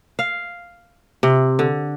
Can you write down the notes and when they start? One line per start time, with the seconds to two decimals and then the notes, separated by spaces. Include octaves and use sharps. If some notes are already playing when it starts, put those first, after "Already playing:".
0.19 F5
1.23 C3
1.59 D3